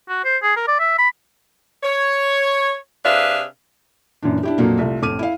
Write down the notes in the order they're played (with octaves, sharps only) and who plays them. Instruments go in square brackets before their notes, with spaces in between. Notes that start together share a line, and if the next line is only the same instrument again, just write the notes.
[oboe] F#4
C5
G#4
A#4
D5
E5
B5
[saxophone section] C#5
C3 D4 G#4 B4 E5 F5
[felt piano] F#2 A#2 E3 D4
D4 E4 G4
F2 A#2 F#3 A#3
C2 A3 F4
A1 F2 D6 F6 D#7
E4 F5